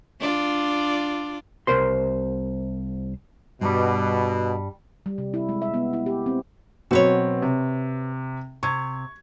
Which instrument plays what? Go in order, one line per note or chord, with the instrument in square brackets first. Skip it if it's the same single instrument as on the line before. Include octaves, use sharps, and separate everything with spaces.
[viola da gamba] D4 F4 D5
[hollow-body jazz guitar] C2 A#4 C5 C6
[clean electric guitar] G2 G3 [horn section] B2
[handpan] G3
C3
E4
G#3
E5
B3
E4
G4
C4
[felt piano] B2 F#3 C4 [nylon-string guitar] F#4 B4 C#5
[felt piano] C3
[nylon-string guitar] C3 [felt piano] C#6 G#6